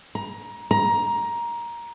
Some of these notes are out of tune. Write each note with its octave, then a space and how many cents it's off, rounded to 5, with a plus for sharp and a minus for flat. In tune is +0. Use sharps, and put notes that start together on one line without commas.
A#5 +25
A#5 +15